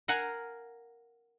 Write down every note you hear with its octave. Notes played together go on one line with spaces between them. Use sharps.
A#4 F5 F#5 G#5